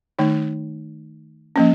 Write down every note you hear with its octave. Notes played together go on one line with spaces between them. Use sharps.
D#3 A3 D#4
F3 A#3 C#4